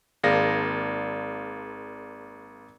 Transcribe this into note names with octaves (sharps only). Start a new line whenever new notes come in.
G#1 A#3 G#4 D5 F5 A#6